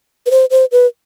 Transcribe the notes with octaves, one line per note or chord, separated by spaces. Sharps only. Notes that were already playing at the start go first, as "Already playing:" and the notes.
B4
C5
C5
B4